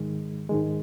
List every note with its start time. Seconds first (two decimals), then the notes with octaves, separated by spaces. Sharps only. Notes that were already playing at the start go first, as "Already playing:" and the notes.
Already playing: G#2 D#3 G#3
0.50 G#2 D#3 G#3